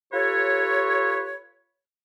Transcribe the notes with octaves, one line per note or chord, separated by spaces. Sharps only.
F4 G4 A4 B4 C#5